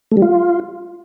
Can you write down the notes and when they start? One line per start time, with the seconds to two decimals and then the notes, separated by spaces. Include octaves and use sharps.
0.12 A3
0.17 G3
0.22 F4